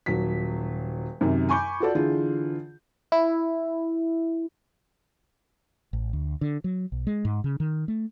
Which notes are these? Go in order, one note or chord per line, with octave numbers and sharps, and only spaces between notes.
D#1 F#3 B6
F#2 C3 D#3
G#5 B5 C#6 D6 G6
F4 F#4 A4 D5
D3 E3 F4 G#4
E4
A1
D2
D3
F#3
B1
G#3
G#2
C#3
D#3
A3